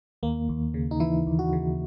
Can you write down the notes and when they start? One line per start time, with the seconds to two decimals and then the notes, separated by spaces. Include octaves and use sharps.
0.23 D#2 A#3
0.49 D#2
0.74 C#3
0.91 D#4
1.00 E3 E4
1.27 D#2
1.39 F#4
1.53 C#3